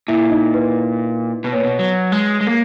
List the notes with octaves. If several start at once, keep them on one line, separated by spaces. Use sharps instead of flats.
A#2 E4 E5
D#4 D#5
B4
B2 B4
A#2 C#5
B2 B4
F#3
G#3
G#3
A#3